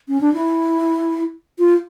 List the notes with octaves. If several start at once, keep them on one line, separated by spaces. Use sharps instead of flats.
C#4
D4
E4
F4